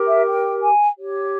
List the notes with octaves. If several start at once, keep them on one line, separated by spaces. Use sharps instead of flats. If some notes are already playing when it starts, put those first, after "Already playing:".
Already playing: G4 A#4
E5
G5
G#5
G4 C#5